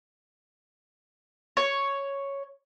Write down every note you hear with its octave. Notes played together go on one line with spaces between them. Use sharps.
C#5